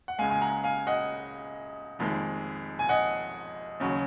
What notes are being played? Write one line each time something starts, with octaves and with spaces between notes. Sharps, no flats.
F#5
C#2 C#3 G#3 F5 G#5
G#5
F#5 A#5
F5 G#5
D#5 F#5
F1 F2 D#3 G#3
G#5
D#5 F#5
D#2 C#3 F#3